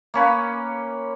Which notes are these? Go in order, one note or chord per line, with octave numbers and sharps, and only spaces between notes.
A#3 C#4 B4